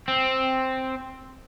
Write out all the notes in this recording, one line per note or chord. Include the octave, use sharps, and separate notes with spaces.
C4